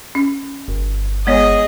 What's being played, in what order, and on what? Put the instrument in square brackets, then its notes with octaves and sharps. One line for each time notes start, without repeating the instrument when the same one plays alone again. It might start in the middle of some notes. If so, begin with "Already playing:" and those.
[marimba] C#4
[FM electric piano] G1
[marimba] G#3 B3 C#5 [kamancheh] G#4 D#5